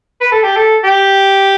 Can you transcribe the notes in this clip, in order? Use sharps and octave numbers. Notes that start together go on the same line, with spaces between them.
B4
A4
G4
A4
G4